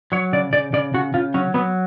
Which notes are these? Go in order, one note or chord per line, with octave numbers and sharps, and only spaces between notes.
F#3 C#5
C#3 D5
C#3 D5
C#3 D5
C#3 F#4
C#3 F4
F#3 C#4
F#3 B3